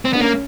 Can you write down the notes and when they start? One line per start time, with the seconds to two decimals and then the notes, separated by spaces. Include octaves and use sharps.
0.05 C4
0.13 B3 D4
0.20 A#3 C#4